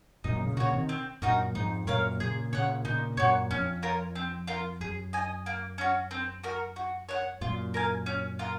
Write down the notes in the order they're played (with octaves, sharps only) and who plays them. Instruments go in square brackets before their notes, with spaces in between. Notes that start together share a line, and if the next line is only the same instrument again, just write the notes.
[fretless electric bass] F#2 A#2 [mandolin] D#4
[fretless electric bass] A#2 C#3
[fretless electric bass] A#2 C#3 [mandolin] F#4 C#5
[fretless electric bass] C3 D#3
[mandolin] C4
[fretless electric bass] F#2 A#2 [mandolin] D#4 F#4 A#4
[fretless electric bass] F2 G#2 [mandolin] D#4
[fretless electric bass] F#2 A#2 [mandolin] A#4 C#5 F5
[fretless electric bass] A#2 C#3 [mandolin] G#4
[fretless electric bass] A#2 C#3 [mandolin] C#5 F#5
[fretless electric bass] A#2 C#3 [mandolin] D#4
[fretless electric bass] F#2 A#2 [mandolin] F#4 C#5
[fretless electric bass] F2 [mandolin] C#4
[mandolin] F4 A#4 C#5
C4
F4 A#4
[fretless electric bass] F#2 [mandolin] G#4
[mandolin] D#5 G#5
A#3
C#4 F#4
C4
F#4 A#4
F#4
C#5 F#5
[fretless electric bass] F#2 A#2 [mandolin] F4
[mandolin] A#4 F5 G#5
C#4
F4 A#4